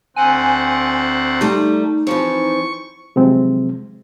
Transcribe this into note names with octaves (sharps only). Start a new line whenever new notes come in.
D2 C4 F#5 G#5
G3 A3 D#4
E3 F3 C4 C#6
C3 D#3 F3 F#3 G#3 C4